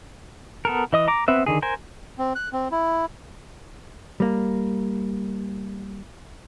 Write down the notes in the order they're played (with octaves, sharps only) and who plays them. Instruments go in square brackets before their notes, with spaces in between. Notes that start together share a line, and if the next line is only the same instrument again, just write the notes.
[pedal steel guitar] B3 A4 A#4
E3 D#5 D#6
A#5 D6
B3 C4 B4 E5
D3 D#3 G#4
A#4 C5 G#5
[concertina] C4
F#6
C4
E4
[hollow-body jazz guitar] G3 A#3